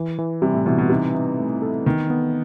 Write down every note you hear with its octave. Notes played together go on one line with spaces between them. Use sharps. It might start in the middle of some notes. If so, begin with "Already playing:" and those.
Already playing: E3
E3
C3 G3
A2
B2 E3
B2
C3 D#4
D#4
A3
A4
D#3 B3
B3